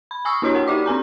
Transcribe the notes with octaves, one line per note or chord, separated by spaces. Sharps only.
B5
G#5 C#6 D#6 E6
A#3 D4 E4 F#4 C#5 A#5
A#4 F#5
D#4 G4 D5 D6
C4 D4 G#5 A#5